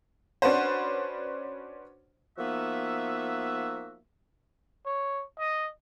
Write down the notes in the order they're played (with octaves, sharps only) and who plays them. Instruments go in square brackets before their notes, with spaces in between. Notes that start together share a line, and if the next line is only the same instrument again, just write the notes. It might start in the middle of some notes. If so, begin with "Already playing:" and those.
[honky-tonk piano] C#4 D4 F#4 B4 C5
[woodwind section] F3 A#3 B3 D#4 F#4 E5
[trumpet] C#5
D#5